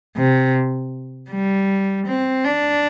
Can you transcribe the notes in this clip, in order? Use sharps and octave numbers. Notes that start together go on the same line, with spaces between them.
C3
G3
C4
D4